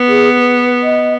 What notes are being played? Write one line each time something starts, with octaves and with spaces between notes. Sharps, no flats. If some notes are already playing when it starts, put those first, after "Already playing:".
Already playing: B3
G#4
B4
D#5